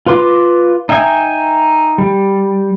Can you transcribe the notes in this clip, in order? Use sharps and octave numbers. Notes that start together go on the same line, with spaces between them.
F4 B4 C6 D6
D#4 E5 G5 G#5
G3